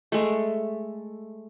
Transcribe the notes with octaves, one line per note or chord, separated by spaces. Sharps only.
G#3 A3